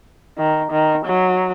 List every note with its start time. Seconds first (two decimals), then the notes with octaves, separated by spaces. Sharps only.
0.38 D#3
0.71 D#3
1.05 F#3